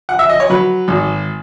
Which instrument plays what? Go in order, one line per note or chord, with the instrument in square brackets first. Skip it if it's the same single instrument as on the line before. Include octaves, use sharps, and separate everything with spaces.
[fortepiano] F#5
E5
D#5
C#5
F#3 B4
G#1